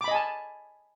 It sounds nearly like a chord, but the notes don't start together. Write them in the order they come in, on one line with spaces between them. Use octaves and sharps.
D6 B5 D#5 G#5 A5